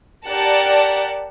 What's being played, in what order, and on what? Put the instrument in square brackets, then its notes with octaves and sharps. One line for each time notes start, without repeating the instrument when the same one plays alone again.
[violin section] G4 A#4 D5 F#5 A5